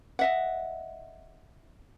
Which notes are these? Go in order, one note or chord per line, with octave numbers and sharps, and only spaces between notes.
D#5 E5 F#5